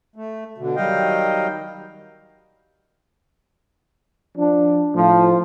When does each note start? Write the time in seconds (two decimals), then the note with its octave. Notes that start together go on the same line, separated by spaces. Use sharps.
0.16 A3
0.58 B2 D3
0.76 D#3 F#3 G3 D#5 F5 G5
4.37 F3 D4
4.94 A2 F3